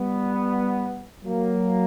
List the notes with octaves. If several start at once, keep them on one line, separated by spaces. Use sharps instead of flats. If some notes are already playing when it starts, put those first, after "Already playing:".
Already playing: G3 B3
F#3 A#3